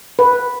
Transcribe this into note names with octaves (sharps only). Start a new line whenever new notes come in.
B4